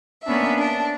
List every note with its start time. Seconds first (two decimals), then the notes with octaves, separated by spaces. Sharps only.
0.25 A#3 B3 C#4 D4 E5
0.59 D4